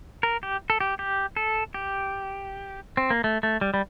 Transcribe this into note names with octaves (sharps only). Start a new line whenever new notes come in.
A#4
G4
A4
G4
G4
A4
G4
C4
A#3
A3
A3
G3
G3